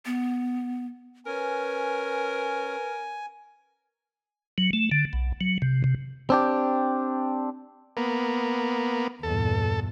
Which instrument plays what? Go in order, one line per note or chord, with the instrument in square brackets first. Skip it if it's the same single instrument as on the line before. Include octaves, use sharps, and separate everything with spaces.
[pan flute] B3
[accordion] C#4 [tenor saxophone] A#4 [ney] B4 [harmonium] G#5
[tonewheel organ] F#3
A3
D3
B1
F#3
C3
C3
[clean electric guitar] C4 D4 G4
[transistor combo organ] A#3 B3
[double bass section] E2 G2 A#2 [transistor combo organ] A4